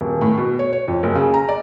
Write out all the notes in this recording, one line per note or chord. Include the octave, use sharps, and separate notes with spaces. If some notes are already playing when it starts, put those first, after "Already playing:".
D#1
A2
B2
C#5
C#5
F2
F#1
C#3
A#5
D5